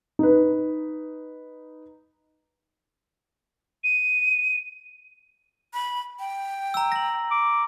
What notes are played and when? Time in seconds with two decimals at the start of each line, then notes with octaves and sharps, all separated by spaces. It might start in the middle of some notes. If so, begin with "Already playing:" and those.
0.19 D#4 B4
3.84 D#7
5.74 B5
6.19 G5
6.74 A#5 E6
6.92 A#6 F#7
7.31 D6